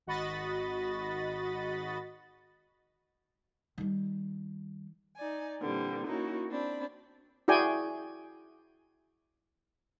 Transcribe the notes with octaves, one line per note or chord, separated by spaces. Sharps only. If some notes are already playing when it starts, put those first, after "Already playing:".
G#1 F#4 D#5 B5 A6
D#3 G3
D#4 D5 G#5
A#2 D3 E3 G3 C4
A#3 C#4 D#4 E4 F#4
C4 D4 B5
E4 F#4 G#4 D5 G5 G#5